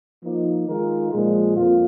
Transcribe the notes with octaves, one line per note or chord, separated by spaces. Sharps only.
F3 A#3 D#4
D#3 G#3 F4 A#4
A#2 F3 G#3
F2 F3 A#3 F4